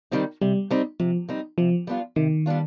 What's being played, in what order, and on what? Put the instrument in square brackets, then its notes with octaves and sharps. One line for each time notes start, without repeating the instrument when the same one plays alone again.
[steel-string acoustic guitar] D#3 G3 C4 D#4
[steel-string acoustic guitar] C3 [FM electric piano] G3
[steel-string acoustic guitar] G3 C4 D#4
[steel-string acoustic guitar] C3 [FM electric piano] F3
[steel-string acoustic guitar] G3 C4 D#4
[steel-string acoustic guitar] C3 [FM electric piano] F3
[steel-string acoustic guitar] G3 B3 D4 F4
[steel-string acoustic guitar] C3 [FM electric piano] D#3
[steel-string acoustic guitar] G3 B3 D4 F4